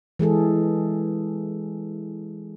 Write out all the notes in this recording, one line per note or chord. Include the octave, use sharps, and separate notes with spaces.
E3 G#3 G#4 A4